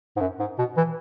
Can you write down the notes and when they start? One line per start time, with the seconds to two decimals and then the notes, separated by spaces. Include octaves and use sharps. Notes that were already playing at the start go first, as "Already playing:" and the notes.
0.16 G#2
0.20 F#2
0.39 G#2
0.58 B2
0.77 E3